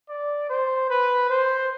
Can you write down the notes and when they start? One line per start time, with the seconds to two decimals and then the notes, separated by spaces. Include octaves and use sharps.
0.09 D5
0.49 C5
0.90 B4
1.30 C5